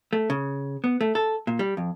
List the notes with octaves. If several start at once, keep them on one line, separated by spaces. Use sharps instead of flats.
A3
C#3
B3
A3
A4
A#2
G3
F2